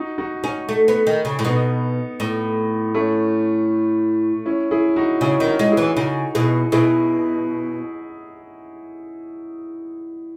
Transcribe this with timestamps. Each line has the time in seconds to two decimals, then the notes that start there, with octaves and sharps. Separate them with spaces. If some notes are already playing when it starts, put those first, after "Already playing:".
Already playing: D#4 F#4
0.18 D#4 F#4
0.43 C#4 D#4 F#4
0.69 A3
0.88 B3
1.07 D#3
1.25 C#3
1.39 A2
1.44 B2 B3 D#4
2.20 A2
2.95 A3 C#4
4.45 C#4 E4
4.71 E4 G#4
4.96 D#4 F#4
5.21 C#3 C#4 E4
5.40 D#3
5.47 D#4 F#4
5.59 G#3
5.71 E4 G#4
5.77 E3
5.97 C#3 D#4 F#4
6.35 B2 E4 G#4
6.72 B2 E4 G#4